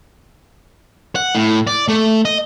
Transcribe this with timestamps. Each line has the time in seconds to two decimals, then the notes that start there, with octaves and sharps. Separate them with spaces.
1.15 F#5
1.35 A2
1.67 D5
1.88 A3
2.25 D#5